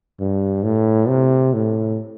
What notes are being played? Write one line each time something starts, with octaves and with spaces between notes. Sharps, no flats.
G2
A2
C3
A2